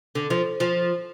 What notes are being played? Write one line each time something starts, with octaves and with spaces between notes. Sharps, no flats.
D3
F3
F3